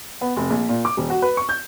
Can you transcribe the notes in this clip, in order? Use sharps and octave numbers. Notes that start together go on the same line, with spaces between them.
B3
F1
A#1
A#2
D6
D#1
F#4
B4
C#6
G6